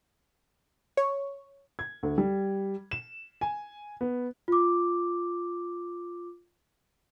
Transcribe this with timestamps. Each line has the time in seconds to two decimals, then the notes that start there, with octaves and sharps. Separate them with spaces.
0.97 C#5
1.79 G#6
2.03 D2
2.18 G3
2.91 E7
3.41 G#5
4.01 B3
4.48 F4 D6